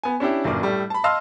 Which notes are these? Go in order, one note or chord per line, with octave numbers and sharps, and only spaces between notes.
B3 G#5
C#4 D4 E4 G4
G1 F#2 A#2 D6
A2 G3 A3
A5 B5
D#5 F5 A5 C6 E6 F6